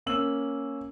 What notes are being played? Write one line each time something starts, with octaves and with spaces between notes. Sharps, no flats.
A#3 C#4 E6 F#7